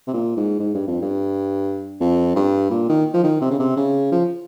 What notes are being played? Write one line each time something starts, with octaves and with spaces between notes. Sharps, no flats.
C3
A#2
G#2
G#2
G2
F2
G2
F2
G2
A#2
D#3
F3
D#3
C3
C#3
C3
C#3
F3